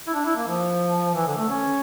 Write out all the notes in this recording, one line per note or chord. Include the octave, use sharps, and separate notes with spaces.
E4
D4
E4
A#3
F3
E3
D3
A3
C#4